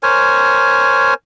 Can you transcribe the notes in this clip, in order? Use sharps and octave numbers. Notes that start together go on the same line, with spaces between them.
A#4 C5 C#5 G#5